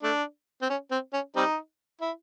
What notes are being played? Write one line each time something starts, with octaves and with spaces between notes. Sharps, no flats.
A3 D4
C4
C#4
C4
C#4
G3 C4 D#4
E4